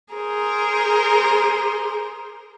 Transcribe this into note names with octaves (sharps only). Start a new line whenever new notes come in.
G#4 A#4 C5